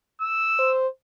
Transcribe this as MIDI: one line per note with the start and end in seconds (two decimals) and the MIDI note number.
0.21 0.72 88
0.59 0.87 72